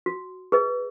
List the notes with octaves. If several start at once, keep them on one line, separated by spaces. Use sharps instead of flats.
F#4
G#4 B4 D#5